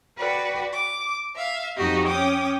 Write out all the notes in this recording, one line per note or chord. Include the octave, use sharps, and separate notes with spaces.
F#4 B4 D5 G5
D6
E5 F5
F2 D#4 F#4 G4 D#5
C#4 G5 D6 D#6